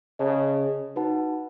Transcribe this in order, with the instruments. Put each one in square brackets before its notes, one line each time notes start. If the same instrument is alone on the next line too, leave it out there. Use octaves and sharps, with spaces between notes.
[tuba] C#3 [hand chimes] G#4 D#5 A5
[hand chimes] D#4 F#4 B4 F#5 A5